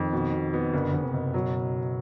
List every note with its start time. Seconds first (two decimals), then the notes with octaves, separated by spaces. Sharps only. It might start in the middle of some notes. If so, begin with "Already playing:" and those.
Already playing: F2 D#3
0.13 B2
0.33 B2
0.53 B3
0.74 F#1 D3
0.94 F#1
1.04 C3
1.14 F#1
1.34 B2 F#3